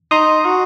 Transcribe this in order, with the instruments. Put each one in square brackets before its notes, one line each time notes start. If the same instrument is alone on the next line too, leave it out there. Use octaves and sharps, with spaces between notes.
[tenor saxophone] D#4 [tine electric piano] C6 D#6
[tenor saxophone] F#4